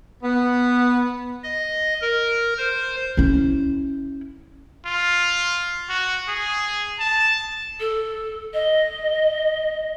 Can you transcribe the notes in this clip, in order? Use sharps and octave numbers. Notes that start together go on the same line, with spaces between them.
B3
D#5
A#4
C5
C#4 E4
F4
F#4
G#4
A5
A4
D#5